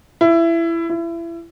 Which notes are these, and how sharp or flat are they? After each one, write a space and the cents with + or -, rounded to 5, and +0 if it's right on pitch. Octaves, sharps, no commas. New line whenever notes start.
E4 +20
E4 +30